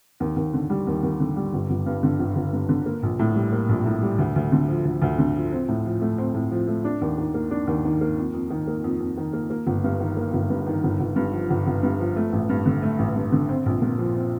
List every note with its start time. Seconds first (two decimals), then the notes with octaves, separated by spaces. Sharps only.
0.20 D#2
0.36 D#2
0.54 D3
0.70 G3
0.87 D#2
1.03 D#2
1.20 D3
1.36 G3
1.53 G1
1.70 G1
1.86 G2
2.03 D3
2.19 G1
2.36 G1
2.53 G2
2.69 D3
2.86 A#3
3.03 A#1
3.19 A2
3.35 G3
3.52 A#3
3.69 A#1
3.86 A2
4.02 G3
4.19 D2
4.36 D2
4.52 D3
4.68 F3
4.85 D2
5.02 D2
5.18 D3
5.35 F3
5.52 C4
5.68 A2
5.85 F3
6.01 A3
6.18 C4
6.34 A2
6.51 F3
6.68 A3
6.84 D4
7.01 D#2
7.18 D#3
7.34 A#3
7.51 D4
7.67 D#2
7.85 D#3
8.01 A#3
8.18 F2
8.34 F2
8.50 D#3
8.67 A#3
8.84 F2
9.00 F2
9.17 D#3
9.33 A#3
9.50 A#3
9.67 G1
9.84 G2
10.00 D#3
10.17 A#3
10.33 G1
10.50 G2
10.67 D#3
10.84 G1
11.00 G1
11.16 G2
11.33 F3
11.50 G1
11.67 G1
11.83 G2
11.99 F3
12.16 A3
12.33 A1
12.49 G2
12.66 D3
12.82 A3
12.99 A1
13.16 G2
13.32 D3
13.49 C4
13.66 A#1
13.82 A#2
13.99 F3
14.15 C4